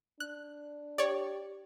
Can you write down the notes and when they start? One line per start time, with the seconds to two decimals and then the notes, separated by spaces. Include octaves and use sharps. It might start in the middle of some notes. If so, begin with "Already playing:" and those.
0.20 D4 F#6
0.98 G4 C#5 D5